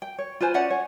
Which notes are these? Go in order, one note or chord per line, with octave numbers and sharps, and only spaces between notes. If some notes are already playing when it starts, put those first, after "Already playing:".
G5
C#5
F4 B4 C5 G#5
C#4 D5 F#5 G#5
C#5